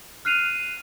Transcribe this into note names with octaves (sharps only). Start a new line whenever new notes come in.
F6 F#6 C7 D#7 F7